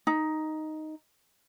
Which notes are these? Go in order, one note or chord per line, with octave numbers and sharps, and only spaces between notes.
D#4